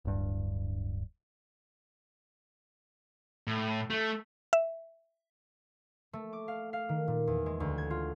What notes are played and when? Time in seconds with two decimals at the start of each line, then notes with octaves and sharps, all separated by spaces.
0.05 D1 G2
3.47 A2
3.90 A3
4.53 E5
6.13 A3
6.33 D6
6.48 F5
6.73 F5
6.89 D#3
7.08 A#2
7.27 E2
7.46 G#3
7.60 D2
7.78 G#6
7.90 F4